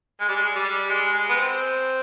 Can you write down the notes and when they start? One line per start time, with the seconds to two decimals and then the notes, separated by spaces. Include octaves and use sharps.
0.20 G#3
0.28 G3
0.35 G#3
0.55 G3
0.89 G#3
1.13 G#3
1.29 B3
1.36 C4